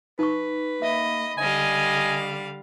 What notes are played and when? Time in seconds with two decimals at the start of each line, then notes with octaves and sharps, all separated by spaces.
0.19 D#4 B4 C#6
0.82 A#3 D#5 E5 B5
1.38 D3 G3 D#5 F5 G#5